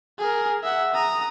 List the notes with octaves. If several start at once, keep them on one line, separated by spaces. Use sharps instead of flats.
G#4 A#4
E5 F#5
A#5 D#6